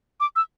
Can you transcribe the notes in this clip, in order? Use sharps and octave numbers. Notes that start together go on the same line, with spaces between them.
D6
E6